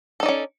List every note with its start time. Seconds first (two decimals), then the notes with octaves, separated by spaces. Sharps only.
0.20 A4
0.23 D#4
0.26 D5
0.29 C#4